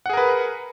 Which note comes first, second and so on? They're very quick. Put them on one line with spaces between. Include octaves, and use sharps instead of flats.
F#5 G#4 A#4 B4